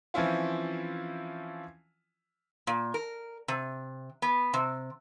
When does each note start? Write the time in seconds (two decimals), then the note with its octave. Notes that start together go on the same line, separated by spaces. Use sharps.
0.14 E3 F3 C4 C#4 E4 F4
2.67 A#2
2.94 A#4
3.48 C3
4.22 B3
4.54 C3